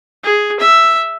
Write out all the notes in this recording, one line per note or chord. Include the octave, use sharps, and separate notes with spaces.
G#4
E5